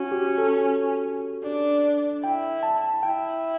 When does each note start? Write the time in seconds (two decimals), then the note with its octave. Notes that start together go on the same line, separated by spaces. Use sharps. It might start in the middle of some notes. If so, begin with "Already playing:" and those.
Already playing: C#4 F#4
0.12 G4
0.38 A4
1.44 D4
2.23 E4 G5
2.63 A5
3.03 E4 G5